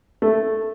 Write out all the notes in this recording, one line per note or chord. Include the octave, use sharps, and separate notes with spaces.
A3